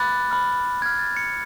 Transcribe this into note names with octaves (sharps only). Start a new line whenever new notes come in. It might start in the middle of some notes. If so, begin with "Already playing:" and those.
Already playing: B5 D6 F#6 A6
B5 F6
B5 F6 G#6
A6
C#7